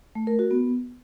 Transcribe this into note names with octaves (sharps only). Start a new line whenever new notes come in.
A3
A#4
F#4
B3